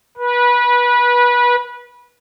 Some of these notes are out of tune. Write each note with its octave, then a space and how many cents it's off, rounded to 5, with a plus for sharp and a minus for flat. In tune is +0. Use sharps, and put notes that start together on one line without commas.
B4 -25